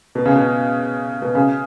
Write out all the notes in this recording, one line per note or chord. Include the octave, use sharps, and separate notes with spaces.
B2
C#3
B2
B2
C#3